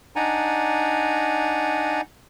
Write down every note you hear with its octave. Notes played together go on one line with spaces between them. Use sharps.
D4 D#4 D5 F#5 G#5 A#5